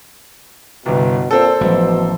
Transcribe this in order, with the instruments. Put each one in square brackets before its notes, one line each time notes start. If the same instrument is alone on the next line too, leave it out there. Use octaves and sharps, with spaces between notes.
[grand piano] G1 C2 [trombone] B2
[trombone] A#2 [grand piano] C4 A4
[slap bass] A1 [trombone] B2 [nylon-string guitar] F3 F#3 G5